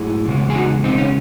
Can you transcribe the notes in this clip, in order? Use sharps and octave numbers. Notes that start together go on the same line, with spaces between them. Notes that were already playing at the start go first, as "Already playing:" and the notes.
Already playing: G#2 F#3 A3 E4 G#4
E2 C#3 G#3
G#4
D#4 F#4
C4 D#4
C#4